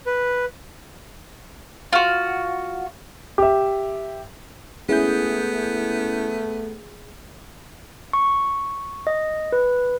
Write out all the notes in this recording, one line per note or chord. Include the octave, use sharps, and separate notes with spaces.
B4
F4 F#4
G4 E5
A3 B3 C#4 E4 G#4 G6
C#6
D#5
B4